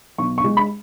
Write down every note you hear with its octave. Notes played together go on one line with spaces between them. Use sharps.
B1 C#6
C#6
G#3
B5